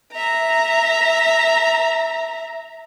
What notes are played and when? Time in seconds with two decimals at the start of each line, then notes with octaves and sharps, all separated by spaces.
0.12 E5 A#5